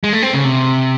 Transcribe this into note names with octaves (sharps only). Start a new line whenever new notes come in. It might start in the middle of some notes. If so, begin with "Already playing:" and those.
G#3
A3
C4
C#3
C3